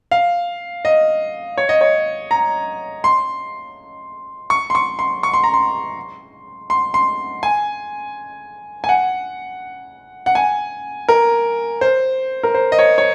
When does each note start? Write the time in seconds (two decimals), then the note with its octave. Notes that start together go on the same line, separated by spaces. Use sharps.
0.11 F5
0.85 D#5
1.58 C#5
1.69 D#5
1.81 C#5
2.31 A#5
3.04 C6
4.50 C#6
4.70 C6
4.75 C#6
4.99 C6
5.23 C#6
5.34 C6
5.44 A#5
5.54 C6
6.70 C6
6.94 C6
7.43 G#5
8.84 G#5
8.89 F#5
10.26 F#5
10.35 G#5
11.09 A#4
11.81 C5
12.43 A#4
12.54 C5
12.72 D#5
12.79 C#5
12.98 C#5